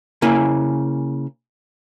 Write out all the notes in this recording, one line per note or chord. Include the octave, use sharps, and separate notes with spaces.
C#3 A#3 E4 G#5